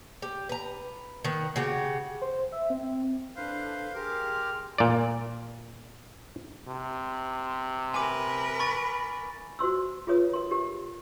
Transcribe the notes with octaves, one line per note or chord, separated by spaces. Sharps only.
G4
B4 A#5
D#3 B3
C#3 F#4 G4
C5
E5
C4
D4 E4 A4 B4 C5 F5
G4 G#4 A#4 G5 C6 D6 F6
A#2 D5
C3
A#4 B4 G#5 D6
B5 C#6 A6
F#4 C5 C6 E6
F4 G#4 B4 C#5 D#6
A#4 C6
G4 A#4